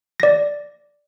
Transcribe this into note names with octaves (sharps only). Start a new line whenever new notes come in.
D5 A#6